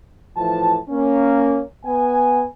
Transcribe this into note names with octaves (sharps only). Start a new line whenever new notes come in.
A2 E3 F3 A5
A#3 C#4
B3 G#5